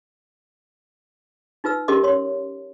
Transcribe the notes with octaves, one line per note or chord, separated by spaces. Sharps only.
D#4 F4 B4 E6
C#4 G4 A#4 D#5 C6 D6
C#5 C6